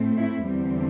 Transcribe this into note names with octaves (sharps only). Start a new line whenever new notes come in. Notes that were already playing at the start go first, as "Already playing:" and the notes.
Already playing: A2 A3 C4
E4
E2 D3 G3 C4